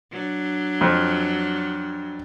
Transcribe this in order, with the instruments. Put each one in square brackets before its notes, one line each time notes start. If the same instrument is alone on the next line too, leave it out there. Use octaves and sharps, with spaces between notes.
[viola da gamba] F#3 D4
[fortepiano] F2